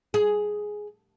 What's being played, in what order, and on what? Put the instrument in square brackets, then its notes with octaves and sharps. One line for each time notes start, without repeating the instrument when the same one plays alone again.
[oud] G#4